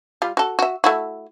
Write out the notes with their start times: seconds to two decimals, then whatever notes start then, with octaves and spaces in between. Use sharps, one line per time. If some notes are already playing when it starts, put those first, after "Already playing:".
0.22 G3 F4
0.37 F#4 A4
0.59 F#4 E5
0.84 A3 E4 F#4